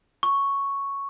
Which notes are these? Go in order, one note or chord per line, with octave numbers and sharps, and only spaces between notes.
C#6